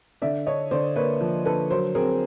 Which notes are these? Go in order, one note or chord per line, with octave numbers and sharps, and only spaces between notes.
D3 D5 E5
D4 C#5 D#5
D3 C5 D5
A#3 B4 C#5
F3
D3 A4 B4
F#3 A#4 C5
C4 G#4 A#4